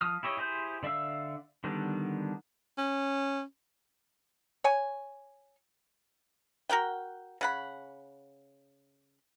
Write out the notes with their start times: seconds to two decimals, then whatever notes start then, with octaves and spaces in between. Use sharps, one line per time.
0.01 F3 D#6 F6
0.23 E4 G4 C#5 D#5
0.37 E4 G4 G#4 C5 G6
0.83 D3 D5 E5 F5 E6
1.64 D3 D#3 G3 B3 D4
2.78 C#4
4.64 C#5 G#5
6.69 F#4 A#4 F#5 G5
7.41 C#3 F#5 B5